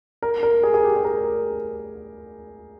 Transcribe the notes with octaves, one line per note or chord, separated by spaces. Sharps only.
A#4
A#4
G#4
G#4
G4
G#4
A#4